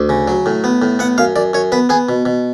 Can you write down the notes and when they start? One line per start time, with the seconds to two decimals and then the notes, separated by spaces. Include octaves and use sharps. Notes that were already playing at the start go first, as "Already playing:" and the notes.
Already playing: D2
0.09 C#3
0.28 F#3
0.46 A2
0.64 B3
0.82 A2
0.99 B3 F#5
1.18 F#2 F5
1.36 F#2 D5
1.53 F#2 C#5
1.72 B3 B4
1.89 B3 G#4
2.09 B2
2.25 B2